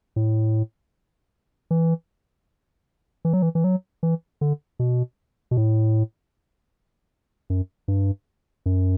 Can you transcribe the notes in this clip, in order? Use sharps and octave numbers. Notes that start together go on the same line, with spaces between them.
A2
E3
E3
F#3
E3
E3
F#3
E3
D3
B2
B2
A2
F#2
G2
F#2